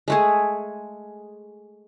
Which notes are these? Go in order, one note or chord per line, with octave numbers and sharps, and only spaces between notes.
G#3 A3 G#4